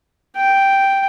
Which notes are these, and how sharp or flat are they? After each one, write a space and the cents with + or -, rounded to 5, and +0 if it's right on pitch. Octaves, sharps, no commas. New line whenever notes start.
G5 +0